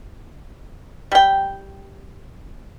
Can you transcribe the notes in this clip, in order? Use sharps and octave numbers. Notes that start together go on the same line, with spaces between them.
G3 G5